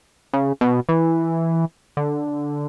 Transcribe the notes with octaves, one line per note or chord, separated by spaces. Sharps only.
C#3
B2
E3
D3